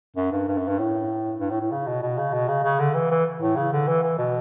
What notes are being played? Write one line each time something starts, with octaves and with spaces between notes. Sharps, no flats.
F#2
G2
G2
F#2
G2
A2
G2
A2
A2
C#3
B2
B2
C#3
B2
C#3
C#3
D3
E3
E3
A2
C#3
D3
E3
E3
B2